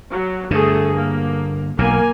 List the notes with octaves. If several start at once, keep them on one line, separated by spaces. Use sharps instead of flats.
F#3
G2 D3 A3 G#4
A#3
B1 B2 A#3 G#5